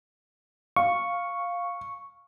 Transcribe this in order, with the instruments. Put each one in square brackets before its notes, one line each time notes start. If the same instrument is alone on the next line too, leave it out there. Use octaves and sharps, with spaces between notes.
[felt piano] F5 [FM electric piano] C#6